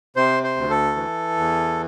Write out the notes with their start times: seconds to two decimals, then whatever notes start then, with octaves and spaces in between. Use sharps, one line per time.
0.16 C3 C5
0.43 C5
0.57 D2
0.70 A4
0.96 E3
1.37 E2